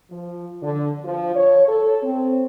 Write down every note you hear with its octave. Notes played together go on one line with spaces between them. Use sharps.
F3
D3
F3
C#5
A4
C4